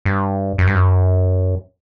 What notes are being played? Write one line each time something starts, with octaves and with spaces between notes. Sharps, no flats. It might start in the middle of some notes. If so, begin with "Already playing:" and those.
G2
F#2
G2
F#2